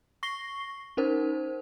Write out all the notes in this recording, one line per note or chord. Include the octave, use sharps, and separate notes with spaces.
C#6 A#6 C7 G7
C#4 D#4 A#4 C5